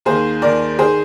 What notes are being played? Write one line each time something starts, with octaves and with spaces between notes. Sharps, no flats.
D#2 D#3 G#4 C5
D#2 D#3 A#4 D5
D#3 G#4 C5